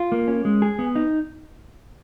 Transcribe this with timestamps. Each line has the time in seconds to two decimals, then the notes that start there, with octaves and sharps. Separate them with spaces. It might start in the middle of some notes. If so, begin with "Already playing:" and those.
Already playing: F4
0.12 A#3
0.28 C#4
0.45 G#3
0.62 G#4
0.79 B3
0.95 D#4